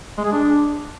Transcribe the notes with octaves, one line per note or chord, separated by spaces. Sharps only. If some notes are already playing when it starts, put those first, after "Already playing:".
G#3
G#4
D4